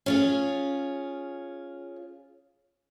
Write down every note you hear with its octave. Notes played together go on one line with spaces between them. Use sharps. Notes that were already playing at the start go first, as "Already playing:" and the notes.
C#4 F4 G#4